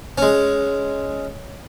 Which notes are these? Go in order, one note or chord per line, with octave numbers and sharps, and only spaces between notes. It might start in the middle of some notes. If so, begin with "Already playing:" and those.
G#3 C#4